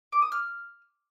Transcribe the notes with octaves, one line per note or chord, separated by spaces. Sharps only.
D6
D#6
F6